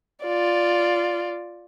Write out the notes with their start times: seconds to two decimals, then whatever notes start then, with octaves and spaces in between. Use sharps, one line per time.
0.23 F4 D5